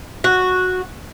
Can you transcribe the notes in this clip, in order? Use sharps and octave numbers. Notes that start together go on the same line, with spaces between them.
F#4